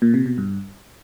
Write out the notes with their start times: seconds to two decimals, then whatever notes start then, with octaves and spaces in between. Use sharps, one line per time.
0.02 A#2
0.14 C3
0.26 B2
0.38 G2